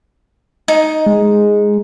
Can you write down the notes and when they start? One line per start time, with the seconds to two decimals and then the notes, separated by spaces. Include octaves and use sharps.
0.68 D#4
1.06 G#3